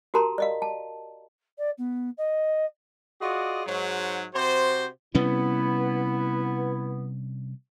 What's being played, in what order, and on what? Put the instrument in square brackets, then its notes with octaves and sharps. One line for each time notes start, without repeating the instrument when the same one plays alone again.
[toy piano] F#4 G4 A#4 A5 A#5 C6
D5 D#5 F5
A5
[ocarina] D5
B3
D#5
[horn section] F4 F#4 G#4 D5 D#5
G#2 F#3
C3 F#4 C5
[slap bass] C3 G3 C#4 [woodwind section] B3 E4